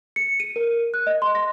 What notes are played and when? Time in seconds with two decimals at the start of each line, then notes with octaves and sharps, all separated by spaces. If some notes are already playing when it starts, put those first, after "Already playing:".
0.16 C#7
0.40 D#7
0.56 A#4
0.94 F#6
1.07 D#5
1.22 C6
1.35 A#6